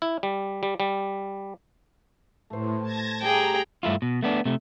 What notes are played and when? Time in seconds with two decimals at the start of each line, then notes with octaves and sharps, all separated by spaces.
0.02 E4
0.23 G3
0.63 G3
0.80 G3
2.50 A2 A3 C5
2.82 A5 G#6 A#6
3.22 G3 A3 G#4 G5 A#5
3.83 G2 A3 E4 F4
4.02 B2
4.23 A3 B3 D4
4.45 C3 A3